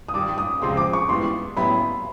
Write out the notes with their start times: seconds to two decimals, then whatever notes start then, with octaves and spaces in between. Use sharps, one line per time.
0.09 D#6
0.14 G2 D#3 G3 D6
0.38 D#6
0.62 C#2 C3 F3 G#3 C4 C6
0.77 D6
0.93 C#6
1.09 G#2 E3 G3 B3 C6
1.56 A2 F#3 B3 E4 G4 B5